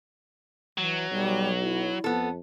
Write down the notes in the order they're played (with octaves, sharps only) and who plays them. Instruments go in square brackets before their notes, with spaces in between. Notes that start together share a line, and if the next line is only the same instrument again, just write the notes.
[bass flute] E3 [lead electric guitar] F#3
[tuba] B1 [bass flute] G3
[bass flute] E4
[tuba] F2 [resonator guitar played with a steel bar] B3 A4